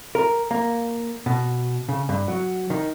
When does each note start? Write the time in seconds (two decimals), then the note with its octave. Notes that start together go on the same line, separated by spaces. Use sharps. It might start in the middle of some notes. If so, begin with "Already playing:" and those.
0.15 A#4
0.51 A#3
1.26 B2
1.89 C#3
2.09 G2
2.28 F#3
2.70 D#3